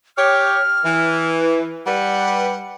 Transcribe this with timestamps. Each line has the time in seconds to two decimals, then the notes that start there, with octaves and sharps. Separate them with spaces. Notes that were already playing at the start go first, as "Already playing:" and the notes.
0.17 G4 C#5 F6
0.83 E3
1.86 G3 B4 F#5